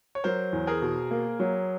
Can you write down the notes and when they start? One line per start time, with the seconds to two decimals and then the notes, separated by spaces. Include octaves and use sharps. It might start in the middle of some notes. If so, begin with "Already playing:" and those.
0.15 C#5
0.24 F#3 A#4 C5
0.53 E2
0.67 G#4 A#4
0.82 B2
1.11 A#3
1.40 F#3